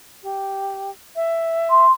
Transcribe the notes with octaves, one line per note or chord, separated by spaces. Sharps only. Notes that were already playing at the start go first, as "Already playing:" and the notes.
G4
E5
C6